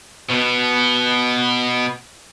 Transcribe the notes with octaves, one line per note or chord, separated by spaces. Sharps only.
B2 B3